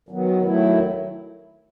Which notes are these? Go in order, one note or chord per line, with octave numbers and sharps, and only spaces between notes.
D#3 F#3 B3
D#3 F#3 A3 E4